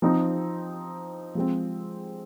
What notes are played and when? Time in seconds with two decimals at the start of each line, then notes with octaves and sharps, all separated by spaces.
0.02 F3 C4 D#4
1.35 F3 G#3 C4